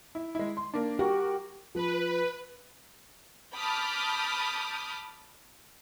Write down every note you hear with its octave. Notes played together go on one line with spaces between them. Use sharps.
E4
G#3 E4
C6
A#3 D4
F#4 G4 A#4 C#6
F3 B4
A5 B5 D6 D#6 F6 G6